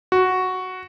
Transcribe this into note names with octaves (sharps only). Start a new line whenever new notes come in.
F#4